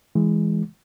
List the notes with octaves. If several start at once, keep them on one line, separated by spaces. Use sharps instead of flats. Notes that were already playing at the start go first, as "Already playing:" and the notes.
E3 G#3